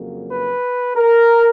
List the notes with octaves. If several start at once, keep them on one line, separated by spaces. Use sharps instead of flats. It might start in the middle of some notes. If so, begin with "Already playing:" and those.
Already playing: F2 C#3 F#3 A#3
B4
A#4